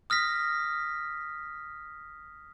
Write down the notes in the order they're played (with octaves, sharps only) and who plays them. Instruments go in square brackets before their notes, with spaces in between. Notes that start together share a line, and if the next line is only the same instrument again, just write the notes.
[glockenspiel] D#6 F6 A#6 B6